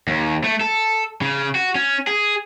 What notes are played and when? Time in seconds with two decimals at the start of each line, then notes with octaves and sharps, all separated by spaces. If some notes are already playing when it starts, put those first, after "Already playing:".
0.08 D#2
0.44 A3
0.61 A4
1.21 C#3
1.55 F#4
1.75 C#4
2.07 G#4